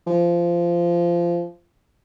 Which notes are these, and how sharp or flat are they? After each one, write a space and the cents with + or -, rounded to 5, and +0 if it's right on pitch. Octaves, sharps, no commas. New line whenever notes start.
F3 -20